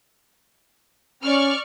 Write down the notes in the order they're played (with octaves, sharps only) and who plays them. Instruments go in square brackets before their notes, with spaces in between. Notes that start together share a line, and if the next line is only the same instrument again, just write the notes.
[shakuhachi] C#4 [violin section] D5 C#6 F6